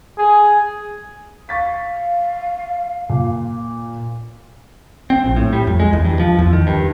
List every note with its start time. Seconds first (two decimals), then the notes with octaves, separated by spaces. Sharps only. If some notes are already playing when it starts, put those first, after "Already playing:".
0.18 G#4
1.49 F5 C#6 A6 B6
3.09 A#2
5.10 C4
5.24 A#1
5.36 A2
5.53 G3
5.67 F2
5.80 G#3
5.93 E2
6.05 G2
6.20 F3
6.38 E2
6.53 D#3
6.67 G2